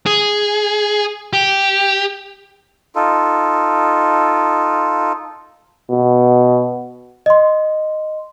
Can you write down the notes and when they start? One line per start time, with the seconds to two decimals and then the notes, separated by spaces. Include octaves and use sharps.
0.06 G#4
1.33 G4
2.95 D#4 F4 A4
5.91 B2
7.26 D#5 C6